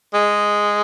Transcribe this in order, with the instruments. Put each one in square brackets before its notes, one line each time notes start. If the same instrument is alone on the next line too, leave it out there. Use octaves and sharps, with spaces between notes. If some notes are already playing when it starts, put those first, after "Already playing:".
[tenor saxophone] G#3